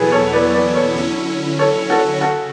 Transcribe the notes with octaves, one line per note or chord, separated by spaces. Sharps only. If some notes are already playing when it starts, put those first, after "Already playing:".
Already playing: E2 B2 F#3 B3 E4 G#4 A4 B4
A4 C#5
B4 D5
B4 D5
A4 C#5
D3 F#3 C#4 E4
A4 C#5
F#4 A4
C#3 F#4 A4